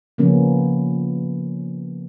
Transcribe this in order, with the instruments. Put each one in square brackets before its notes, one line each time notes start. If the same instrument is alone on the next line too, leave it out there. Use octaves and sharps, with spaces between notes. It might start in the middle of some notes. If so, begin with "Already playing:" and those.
[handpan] C#3 F3 A#3 B3 C#4